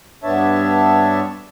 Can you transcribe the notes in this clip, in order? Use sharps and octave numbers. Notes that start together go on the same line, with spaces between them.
G2 B3 D4 C#5 E5 A5